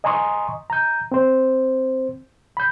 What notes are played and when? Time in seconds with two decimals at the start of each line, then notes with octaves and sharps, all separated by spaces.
0.04 D#5 G#5 A#5 C6 C#6 D#6
0.70 A#5 G6
1.12 C4 C5
2.57 B5 G6